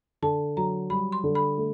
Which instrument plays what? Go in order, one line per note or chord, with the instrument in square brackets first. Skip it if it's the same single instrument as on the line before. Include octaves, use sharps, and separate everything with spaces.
[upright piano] D3 [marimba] A5
[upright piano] F#3 [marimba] A#5
[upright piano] G3 [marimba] B5
[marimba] C6
[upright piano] D3
[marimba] B5
[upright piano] A3